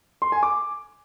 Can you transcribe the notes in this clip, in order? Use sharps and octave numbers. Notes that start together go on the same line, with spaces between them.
C6
G#5
D6